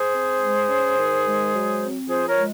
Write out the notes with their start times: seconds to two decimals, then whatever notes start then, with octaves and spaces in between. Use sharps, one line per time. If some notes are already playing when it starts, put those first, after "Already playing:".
Already playing: G#4 C5
0.14 C4
0.42 G#3
0.69 C#4
0.98 D#3
1.26 G#3
1.54 F#3
1.81 C4
2.09 F3 G#4 C5
2.28 A#4 C#5
2.37 G#3